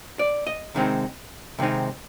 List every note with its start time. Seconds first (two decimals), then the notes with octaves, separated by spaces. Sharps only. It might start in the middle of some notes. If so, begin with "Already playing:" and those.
0.19 D5
0.47 D#5
0.75 C3 D#3 G#3 C4 D#4
1.59 C3 D#3 G#3 C4 D#4